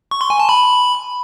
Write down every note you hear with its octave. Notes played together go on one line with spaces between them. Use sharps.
C#6
C6
G#5
A5
B5